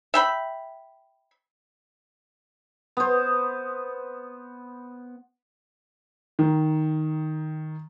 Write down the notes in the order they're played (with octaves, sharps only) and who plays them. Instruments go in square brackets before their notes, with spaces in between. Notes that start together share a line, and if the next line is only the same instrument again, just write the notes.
[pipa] E5 G5 B5
[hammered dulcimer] B3 C5
[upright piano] D#3